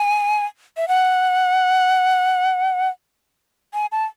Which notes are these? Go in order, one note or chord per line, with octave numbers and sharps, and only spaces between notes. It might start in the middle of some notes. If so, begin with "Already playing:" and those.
Already playing: G#5
E5
F#5
G#5
A5